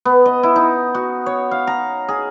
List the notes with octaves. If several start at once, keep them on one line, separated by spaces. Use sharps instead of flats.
B3
D#5
E4
D#4
F#4
C#5
F5
A#5
G#4